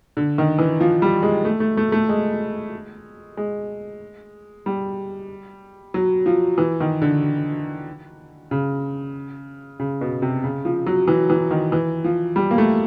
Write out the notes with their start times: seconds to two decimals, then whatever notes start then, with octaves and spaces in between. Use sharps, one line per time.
0.17 D3
0.38 D#3
0.59 E3
0.80 F3
1.02 G3
1.23 G#3
1.45 A3
1.60 A3
1.77 A3
1.92 A3
2.09 G#3
3.37 G#3
4.66 G3
5.94 F#3
6.26 F3
6.58 E3
6.80 D#3
7.02 D3
8.51 C#3
9.80 C#3
10.01 B2
10.22 C3
10.44 C#3
10.65 F3
10.86 F#3
11.08 E3
11.30 E3
11.51 D#3
11.72 E3
12.04 F3
12.36 G3
12.51 A#3
12.58 A3